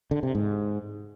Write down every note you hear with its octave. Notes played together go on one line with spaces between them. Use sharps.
D3
C3
G#2